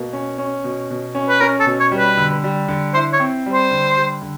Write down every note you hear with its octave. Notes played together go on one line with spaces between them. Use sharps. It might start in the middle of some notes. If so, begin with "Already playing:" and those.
Already playing: B2 A#3
C#4
C#4
B2
B2
C#4
B4
C#4 A#4
A4
B2
C#5
G3
B4
D3
G3
D3
E4 C5
C#5
C4
G3
C5
D3
G3
D3